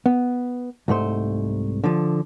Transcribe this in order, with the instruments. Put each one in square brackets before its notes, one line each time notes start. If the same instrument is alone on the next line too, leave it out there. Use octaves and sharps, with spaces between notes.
[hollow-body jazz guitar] B3
C2 G#2 A3 C5
D3 F3